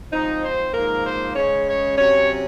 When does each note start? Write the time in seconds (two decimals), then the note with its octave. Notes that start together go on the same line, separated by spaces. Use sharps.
0.12 G#2 F3 C4 D#4
0.43 C5
0.74 G#2 F3 A#3 A#4
1.05 C5
1.36 C#3 G#3 C#4 C#5
1.67 C#5
1.97 C3 F#3 C#4 C#5